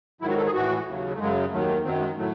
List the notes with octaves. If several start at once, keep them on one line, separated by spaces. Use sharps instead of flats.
G#2 D#3 F#3 E4
F#4
A4
G#4
A2 E3 F#4
D#2 C#3 F#3
A3
F#2 C#3 F#3 G#3
D#2 D#3 F#3 A3
A3
F#2 D#3 F#3 C4
G#3
A2 F#3 A3